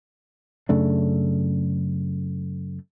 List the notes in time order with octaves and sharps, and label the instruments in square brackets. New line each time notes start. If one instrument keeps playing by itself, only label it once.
[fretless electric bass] F#2 C#3 A3 D4